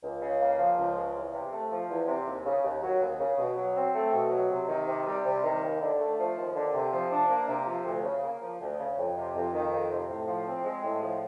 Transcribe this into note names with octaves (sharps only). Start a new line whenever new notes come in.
C#2
C#3
A#3
F3
C#2
C#3
E2
C3
A3
F3
E2
C3
D#2
C#3
D#2
F#3
D#2
C#3
B2
F#3
C4
A3
B2
F#3
C3
D#3
C3
G3
C3
D#3
D#2
D3
A3
F3
D#2
D3
C3
F3
D4
A#3
C3
F3
D2
C#3
A#3
F3
D2
C#3
F2
C3
F2
D#3
F2
C3
A2
F3
C4
G#3
A2
F3